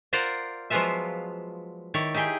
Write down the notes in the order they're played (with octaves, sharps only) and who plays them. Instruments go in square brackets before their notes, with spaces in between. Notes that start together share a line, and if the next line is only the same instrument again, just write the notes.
[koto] F4 A#4 C5 D5 F#5
F3 F#3 G#3 B3 F4 E5
D#3 E4 C#5 D5
D#4 E4 G4 G#4 G5